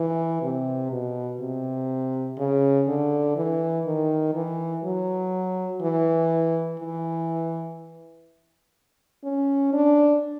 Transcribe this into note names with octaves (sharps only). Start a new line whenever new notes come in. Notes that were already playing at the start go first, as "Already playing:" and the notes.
Already playing: E3
C3
B2
C3
C#3
D3
E3
D#3
E3
F#3
E3
E3
C#4
D4